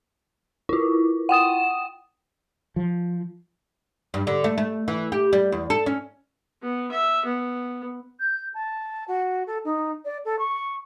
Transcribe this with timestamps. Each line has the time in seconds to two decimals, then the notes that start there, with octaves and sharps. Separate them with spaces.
0.69 E4 F4
1.29 F#5 G5 D#6 E7
2.76 F3
4.14 G2
4.27 D3
4.44 A3
4.58 A3
4.88 E3
5.12 G4
5.33 G3
5.52 E2
5.70 A4
5.86 C#4
6.61 B3
6.91 E5
7.25 B3
8.19 G6
8.54 A5
9.08 F#4
9.47 A4
9.64 D#4
10.05 D5
10.25 A4
10.39 C#6